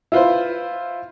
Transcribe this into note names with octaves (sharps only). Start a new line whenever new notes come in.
E4 F4 B4 C5